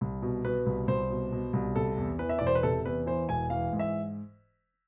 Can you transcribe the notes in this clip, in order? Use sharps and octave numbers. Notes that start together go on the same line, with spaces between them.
C2
B2
B2 B4
C2
C2 C5
B2
B2
C2
C3 A4
E2
E3 B4
E5
E1 D5
C5
B4
C3 A4
E2 B4
E3 C5
E1 G#5
E3 F5
G#2
E5